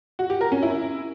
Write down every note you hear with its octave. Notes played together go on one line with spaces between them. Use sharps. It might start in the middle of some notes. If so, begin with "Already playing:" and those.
F#4
G4
A#4
C#4
E4